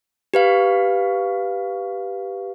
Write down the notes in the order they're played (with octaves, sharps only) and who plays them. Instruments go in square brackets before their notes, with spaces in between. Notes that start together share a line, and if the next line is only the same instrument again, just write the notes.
[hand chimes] G4 B4 F5